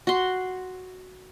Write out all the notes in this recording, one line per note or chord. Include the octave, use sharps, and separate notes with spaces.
F#4 C6